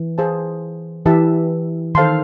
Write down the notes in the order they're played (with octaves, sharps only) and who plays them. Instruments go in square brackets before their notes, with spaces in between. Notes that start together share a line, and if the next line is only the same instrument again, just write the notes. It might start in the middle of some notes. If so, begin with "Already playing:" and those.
Already playing: [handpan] E3
[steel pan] G#4 C5 F5 A5
[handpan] E3 [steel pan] E4 G4 B4 E5 A5
[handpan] D#3 [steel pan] A4 C5 F5 A5 C6